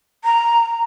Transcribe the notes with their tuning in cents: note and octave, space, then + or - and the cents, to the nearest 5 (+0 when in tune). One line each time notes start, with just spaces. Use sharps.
A#5 +0